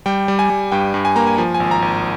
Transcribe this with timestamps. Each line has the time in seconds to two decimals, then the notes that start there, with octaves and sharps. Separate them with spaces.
0.06 G3 G5
0.28 G3
0.39 G#5
0.50 G3
0.72 G2 G5
0.94 G2
1.05 G#5
1.16 A#3 A#5
1.27 G#5
1.38 F3 G#5
1.54 G#5
1.60 G#1
1.71 A#5
1.82 G#1